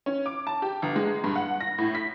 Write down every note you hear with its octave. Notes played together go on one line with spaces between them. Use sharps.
C#4
D6
A5
G4
G1
G#3
G2
F#5
A#6
A2
B6